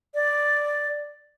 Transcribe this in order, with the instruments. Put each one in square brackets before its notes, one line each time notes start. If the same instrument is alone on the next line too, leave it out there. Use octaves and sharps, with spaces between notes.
[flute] D5